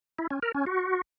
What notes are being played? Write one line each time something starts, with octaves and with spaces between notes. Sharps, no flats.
E4
C#4
A#4
C#4
F#4